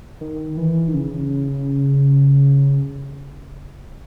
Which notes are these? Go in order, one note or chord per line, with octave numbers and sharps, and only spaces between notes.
D#3
E3
D#3
C#3